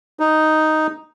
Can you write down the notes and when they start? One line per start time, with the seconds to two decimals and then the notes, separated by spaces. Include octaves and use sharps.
0.20 D#4